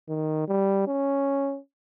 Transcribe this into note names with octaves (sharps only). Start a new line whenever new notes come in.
D#3
G3
C#4